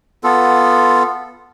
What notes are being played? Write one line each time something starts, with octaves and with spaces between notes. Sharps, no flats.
B3 F4 A4